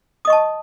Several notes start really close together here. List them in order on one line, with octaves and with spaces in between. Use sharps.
D#6 D#5 C#6 A5